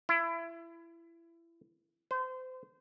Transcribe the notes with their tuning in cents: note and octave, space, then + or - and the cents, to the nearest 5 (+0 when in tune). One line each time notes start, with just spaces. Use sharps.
E4 +25
C5 -30